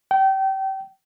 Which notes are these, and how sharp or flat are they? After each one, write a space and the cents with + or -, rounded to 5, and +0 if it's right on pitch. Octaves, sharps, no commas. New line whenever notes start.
G5 -30